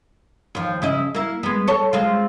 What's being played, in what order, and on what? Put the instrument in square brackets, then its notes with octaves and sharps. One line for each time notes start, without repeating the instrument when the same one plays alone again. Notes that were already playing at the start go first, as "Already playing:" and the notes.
[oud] D#2 F3
C#3 E4 D#5
A#3 E4
G#3 B3
A4 C#5
G#3 C4 F4